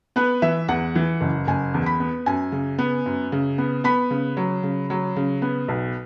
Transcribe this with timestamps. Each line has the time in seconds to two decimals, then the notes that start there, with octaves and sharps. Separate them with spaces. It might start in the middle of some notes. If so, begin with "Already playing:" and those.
0.16 B3 B4
0.42 E3 E5
0.68 E2 F#5
0.95 E3
1.21 F#1
1.47 F#1 G#5
1.74 E2
1.86 B5
2.00 B3
2.26 F#2 G#5
2.52 C#3
2.78 B3
3.06 F#2
3.32 C#3
3.58 B3
3.84 B3 B5
4.10 C#3
4.37 F#3
4.63 C#3
4.90 F#3
5.16 C#3
5.42 B3
5.68 B1